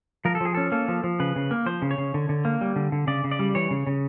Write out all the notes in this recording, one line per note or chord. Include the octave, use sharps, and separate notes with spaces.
F3 A#4
A4
F3 G#4
C#4 A4
A#3 A4
F3
F3
C#3 B4
C#3
A#3
F3 C5
C#3
C#5
C#3
D3
D3
A#3
G3
D3
D3
C#3 D5
C#3
D5
G3
E3 C#5
C#3
C#3